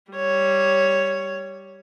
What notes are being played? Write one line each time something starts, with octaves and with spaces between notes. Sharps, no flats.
G3 C#5